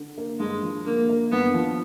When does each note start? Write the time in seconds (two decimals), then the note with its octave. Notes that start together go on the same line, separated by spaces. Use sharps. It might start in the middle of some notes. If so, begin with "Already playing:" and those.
Already playing: D3
0.18 A#3
0.39 G2 G#3
0.62 F3
0.85 D3 A#3
1.09 A#3
1.32 G2 B3
1.54 F3